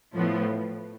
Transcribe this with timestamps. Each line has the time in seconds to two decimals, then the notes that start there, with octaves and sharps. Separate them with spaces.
0.14 A2 F3 B3